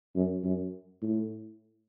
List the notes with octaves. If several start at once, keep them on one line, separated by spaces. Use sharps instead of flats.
F#2
F#2
A2